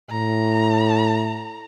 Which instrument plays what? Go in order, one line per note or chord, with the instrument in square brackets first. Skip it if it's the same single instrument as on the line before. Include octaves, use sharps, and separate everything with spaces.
[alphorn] A2 [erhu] A#5